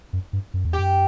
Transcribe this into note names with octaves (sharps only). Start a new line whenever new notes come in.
F#2
G2
F#2
E2
G4
F#2